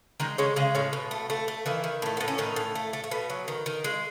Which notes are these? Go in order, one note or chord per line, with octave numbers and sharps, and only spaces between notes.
D#3 G#3 D#4
C#3 G#3 C#4
C#3 G#3 C#4
A2 C#3 C#4
B2
A3
A3
A3
D#3 E3 E4
D#3
A2 A3
A2 B3
C#4
A2 D#3 D#4
A2
A3
A3
A3
B2 B3
F#3
D#3
D#3
G#3